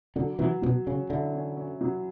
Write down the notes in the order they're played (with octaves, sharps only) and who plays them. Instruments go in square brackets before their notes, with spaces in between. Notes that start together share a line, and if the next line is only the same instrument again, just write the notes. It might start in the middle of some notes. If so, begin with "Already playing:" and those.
[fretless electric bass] D3 [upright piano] F#3
[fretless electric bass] E3 [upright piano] F#3
[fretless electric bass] B2 [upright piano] F#3
[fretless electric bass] C#3 [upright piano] C#4
[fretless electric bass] D3 [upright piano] E4
[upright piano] C#4
C#4
F#3